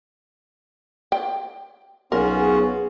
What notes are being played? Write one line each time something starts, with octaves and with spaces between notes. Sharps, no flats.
G5
B1 B3 C#4 F4 F#4 G#4 A#4